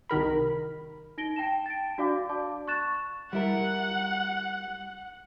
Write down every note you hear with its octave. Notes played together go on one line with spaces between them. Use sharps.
C2 D#3 A#4 B5
D#4 A#6 D7 G7
G5 A5 E7
A6 D7
D4 F#4 D5 F5 D6
D5 A5 D6
C#6 F#6 A6 E7
G3 E4 A#4 F#5